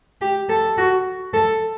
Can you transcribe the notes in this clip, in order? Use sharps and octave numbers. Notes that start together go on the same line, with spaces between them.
G4
A4
F#4
A4